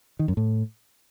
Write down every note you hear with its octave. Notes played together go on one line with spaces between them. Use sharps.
D#3
F#2
A2